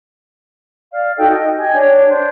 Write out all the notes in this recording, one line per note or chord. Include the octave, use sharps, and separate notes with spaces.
D5 F5
D#4 F#4 A4 G5
D#5
G4 D#5 G#5
D4 C#5
D4 C5